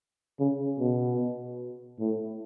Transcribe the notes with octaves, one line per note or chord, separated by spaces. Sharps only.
C#3
B2
A2